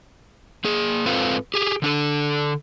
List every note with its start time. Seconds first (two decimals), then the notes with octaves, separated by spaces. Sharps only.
0.64 A#3 G#4
1.06 G#2 C4 F4 A4 B4 F5
1.54 G4 G#4
1.82 D3 D4 A4